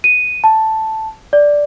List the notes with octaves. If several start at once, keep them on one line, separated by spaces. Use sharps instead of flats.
D#7
A5
D5